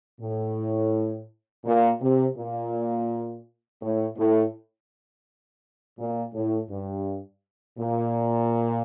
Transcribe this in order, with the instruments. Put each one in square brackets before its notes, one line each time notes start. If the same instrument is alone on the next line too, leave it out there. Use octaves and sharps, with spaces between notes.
[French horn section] A2
A#2
C3
A#2
A2
A2
A#2
A2
G2
A#2